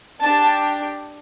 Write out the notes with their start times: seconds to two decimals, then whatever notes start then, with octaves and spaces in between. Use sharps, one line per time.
0.23 D4 G4 A5